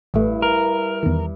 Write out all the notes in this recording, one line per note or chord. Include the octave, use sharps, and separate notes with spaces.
A1 G2 A3 E4
A#4
E2 D#3